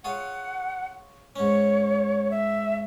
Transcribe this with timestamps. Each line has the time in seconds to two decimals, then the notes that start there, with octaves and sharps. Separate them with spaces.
0.04 F4 G#4 C#5 F#5
1.36 G#2 C#4 C#5
2.31 E5